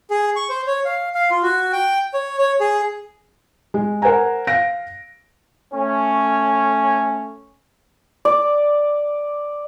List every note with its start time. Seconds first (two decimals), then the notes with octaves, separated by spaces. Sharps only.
0.10 G#4
0.36 C#6
0.49 C5
0.67 C#5
0.85 F5
1.14 F5
1.31 F4
1.43 F#4
1.72 G5
2.14 C#5
2.38 C#5
2.60 G#4
3.74 G#3
4.02 A#4 C5 F#5 G#5 A#5
4.47 F5 A#6 D7
5.74 A3 C#4
8.25 D5